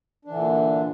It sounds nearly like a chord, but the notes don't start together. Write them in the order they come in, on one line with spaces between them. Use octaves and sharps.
D4 E3 D3 A#2